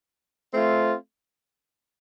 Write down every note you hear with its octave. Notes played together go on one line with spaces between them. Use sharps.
A3 C4 F4